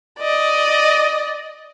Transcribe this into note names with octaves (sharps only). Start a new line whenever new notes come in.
D5 D#5